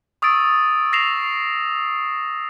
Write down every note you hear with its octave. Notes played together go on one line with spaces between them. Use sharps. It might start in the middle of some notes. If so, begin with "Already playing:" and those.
C#6 D#6 E6 A6 D7
E6 A#6 C7 E7 F7